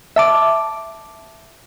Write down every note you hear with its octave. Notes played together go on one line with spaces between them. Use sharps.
E5 A5 D6